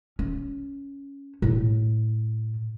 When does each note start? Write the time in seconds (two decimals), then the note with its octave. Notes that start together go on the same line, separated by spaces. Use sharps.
0.19 C#4
1.42 A2